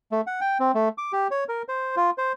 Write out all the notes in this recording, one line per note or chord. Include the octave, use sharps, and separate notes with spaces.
A3
F#5
G5
C4
A3
D6
G4
C#5
A#4
C5
F4
C5